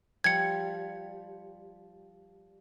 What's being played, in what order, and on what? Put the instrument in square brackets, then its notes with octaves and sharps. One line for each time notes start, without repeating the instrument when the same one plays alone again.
[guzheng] F3 G3 [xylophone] G#6 C#7